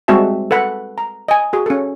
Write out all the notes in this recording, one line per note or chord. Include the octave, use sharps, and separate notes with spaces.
G3 G#3 C4 F#4 E5 A5
A4 B4 F#5 B5
A#5
D#5 G#5
F#4 G#4
C#4 A4